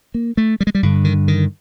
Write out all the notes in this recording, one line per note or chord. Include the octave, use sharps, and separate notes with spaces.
A#3
A3
G3
G#3
G3
G2 D3
D#3
D#3